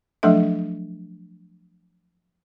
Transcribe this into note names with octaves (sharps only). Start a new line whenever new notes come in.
F3 F#3 A3 D4 A4 E5